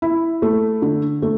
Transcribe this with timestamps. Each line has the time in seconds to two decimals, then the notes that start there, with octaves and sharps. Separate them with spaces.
0.02 E4
0.42 A3
0.82 D3
1.22 A3